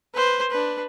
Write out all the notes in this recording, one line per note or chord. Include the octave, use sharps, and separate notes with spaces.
B4 C5
D4 B4